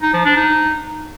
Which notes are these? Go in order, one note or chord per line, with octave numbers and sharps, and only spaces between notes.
D#4
F3
D4
D#4